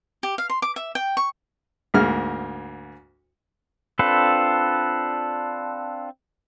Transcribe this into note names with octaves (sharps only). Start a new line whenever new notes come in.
G4
F5
C6
D6
E5
G5
C#6
D2 G#2 A#3 F6
C4 D4 F4 A4 B4